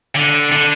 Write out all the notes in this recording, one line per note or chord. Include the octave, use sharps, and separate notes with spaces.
D3
D3